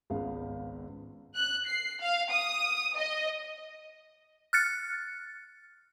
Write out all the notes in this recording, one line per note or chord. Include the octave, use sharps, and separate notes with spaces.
G#1 C#2 C#3 G#3 B3 F5
F#6
C7
F5
D#6
D#5
F6 F#6 A6 C#7